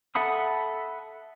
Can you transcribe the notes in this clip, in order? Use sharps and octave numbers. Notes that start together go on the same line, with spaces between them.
A4 E5 F#5 B5 D#6